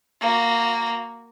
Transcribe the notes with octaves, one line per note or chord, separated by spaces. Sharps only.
A#3 F#4